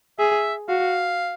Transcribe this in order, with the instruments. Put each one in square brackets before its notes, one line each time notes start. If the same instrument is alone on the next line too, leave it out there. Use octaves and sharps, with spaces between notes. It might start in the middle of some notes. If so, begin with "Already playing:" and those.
[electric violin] G#4 [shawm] E5
[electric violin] F#4 [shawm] F5